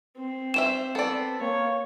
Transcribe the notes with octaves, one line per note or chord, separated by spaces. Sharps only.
C4
G4 C5 E5 E7
B3 A4 D5
A#3 C#5